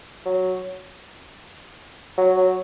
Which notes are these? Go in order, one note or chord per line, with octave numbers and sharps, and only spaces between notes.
F#3
F#3
F#3